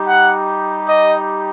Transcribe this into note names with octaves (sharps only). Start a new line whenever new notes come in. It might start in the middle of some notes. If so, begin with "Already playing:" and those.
Already playing: G3 D#4 G4
F#5
D#5